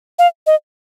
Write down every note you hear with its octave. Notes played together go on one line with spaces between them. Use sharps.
F5
D#5